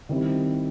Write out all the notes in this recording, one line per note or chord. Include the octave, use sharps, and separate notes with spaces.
D#3 G3 C4 E4